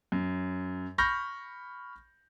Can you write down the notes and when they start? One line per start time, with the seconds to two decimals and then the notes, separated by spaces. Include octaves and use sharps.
0.12 F#2
0.98 B5 C#6 F6 G6 A#6